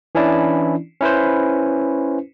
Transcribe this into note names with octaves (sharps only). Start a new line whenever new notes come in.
E3 C#4 D4 E4 D5
C#4 E4 B4 C5